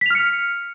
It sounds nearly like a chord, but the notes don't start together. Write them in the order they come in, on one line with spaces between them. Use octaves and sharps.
B6 F7 F6 C#7